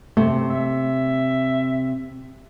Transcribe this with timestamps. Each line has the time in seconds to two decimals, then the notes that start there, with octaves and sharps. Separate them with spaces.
0.17 C3 A3
0.50 E5